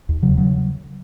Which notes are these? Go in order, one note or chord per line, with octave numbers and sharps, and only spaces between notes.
D#2
C#3 F#3
C#3 F#3